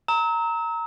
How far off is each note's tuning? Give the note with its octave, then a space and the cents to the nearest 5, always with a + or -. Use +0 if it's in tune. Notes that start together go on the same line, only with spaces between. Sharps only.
A#5 -10 E6 -40